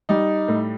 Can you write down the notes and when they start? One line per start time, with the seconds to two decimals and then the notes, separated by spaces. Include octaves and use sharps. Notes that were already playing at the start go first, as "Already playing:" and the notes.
0.09 G3 D#4
0.48 A2